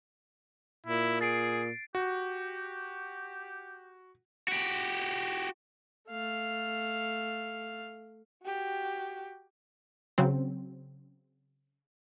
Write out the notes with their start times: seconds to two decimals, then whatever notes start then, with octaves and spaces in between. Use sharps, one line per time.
0.86 A#2 E4
1.21 G#4 A6 C7 D7
1.95 F#4 G4
4.48 F#4 G4
6.10 A3 F5
8.44 F#4 G4
10.18 C#3 F#3 C4